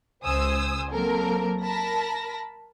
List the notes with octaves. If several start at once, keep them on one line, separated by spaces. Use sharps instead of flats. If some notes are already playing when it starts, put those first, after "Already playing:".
C#2 C5 G#5 D#6 E6
F#3 A#3 C4 A4 A#4
A#4 A5 B5 A#6